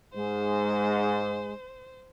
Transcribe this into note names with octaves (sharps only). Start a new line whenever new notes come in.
G#2 G#3 C5